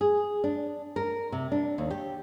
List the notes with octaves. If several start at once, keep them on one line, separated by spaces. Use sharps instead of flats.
G#4
D4
A#4
C3
D4
D#2
G4